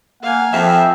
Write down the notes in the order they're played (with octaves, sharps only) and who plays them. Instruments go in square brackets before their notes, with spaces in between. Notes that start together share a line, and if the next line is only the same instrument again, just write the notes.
[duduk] A#3 [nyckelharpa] F5 G#5 [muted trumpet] F#5
[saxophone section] F2 E5 [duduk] F3 [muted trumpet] G5